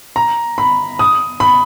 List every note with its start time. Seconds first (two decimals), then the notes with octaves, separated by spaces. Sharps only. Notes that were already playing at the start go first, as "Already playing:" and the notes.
0.16 A#5
0.58 B5
0.99 D#6
1.40 B5